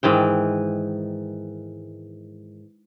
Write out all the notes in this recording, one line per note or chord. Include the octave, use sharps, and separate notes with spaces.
G#2 D#3 E3 G5